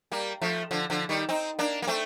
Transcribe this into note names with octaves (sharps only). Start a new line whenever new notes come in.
G3 A#3
F3 A3
D3 F3
D3 F3
D#3 G3
C4 D#4
A#3 D4
A#3
A3 C4